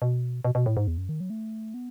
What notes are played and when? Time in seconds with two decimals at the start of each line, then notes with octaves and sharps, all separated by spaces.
0.02 B2
0.45 B2
0.55 B2
0.66 A2
0.77 G#2
0.87 E2
0.98 F#2
1.09 D#3
1.20 F#3
1.30 A3
1.74 B3